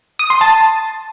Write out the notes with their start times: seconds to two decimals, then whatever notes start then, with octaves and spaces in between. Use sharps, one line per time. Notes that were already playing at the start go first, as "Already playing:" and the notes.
0.19 D#6
0.30 C6
0.41 A5